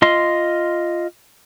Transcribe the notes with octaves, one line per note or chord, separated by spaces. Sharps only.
F4 D#5 C6